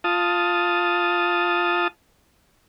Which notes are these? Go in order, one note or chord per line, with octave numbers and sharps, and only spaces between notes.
F4 A5 D#6